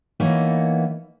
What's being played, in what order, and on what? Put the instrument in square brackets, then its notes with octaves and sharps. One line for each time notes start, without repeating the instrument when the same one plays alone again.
[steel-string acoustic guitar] E3 A#3 B3 D#4 C#5